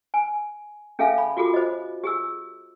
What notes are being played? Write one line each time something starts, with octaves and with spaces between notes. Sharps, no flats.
G#5
C#4 G#4 A4 E5 F5 G#5
B5
F4 F#4 G#4 A4 D6
C5 D#5
G4 G#4 E6